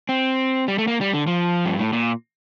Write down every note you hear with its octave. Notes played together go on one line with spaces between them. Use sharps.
C4
G3
A3
A#3
G3
D3
F3
G2
A2
A#2